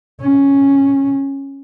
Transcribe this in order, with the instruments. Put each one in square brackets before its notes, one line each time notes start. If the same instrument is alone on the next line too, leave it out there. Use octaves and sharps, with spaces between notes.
[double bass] C#4